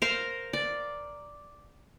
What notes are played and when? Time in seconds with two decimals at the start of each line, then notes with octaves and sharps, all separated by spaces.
0.02 A#4 C5 F5
0.53 D5